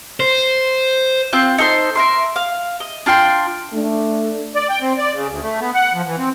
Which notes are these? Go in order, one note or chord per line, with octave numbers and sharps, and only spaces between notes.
C5
C4 F4 F#6 G6
D#4 A4 C5 C6
A#4 E5 C6
F5
D#5
D4 F4 G5 C6
A3 D4
D5
G5
C4
D5
C#3
D2
A3
B3
F#5
F3
E3
C4